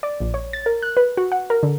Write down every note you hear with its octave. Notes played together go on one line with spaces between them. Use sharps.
D5
A#1
C#5
A6
A#4
F#6
B4
F#4
F#5
A#4
D3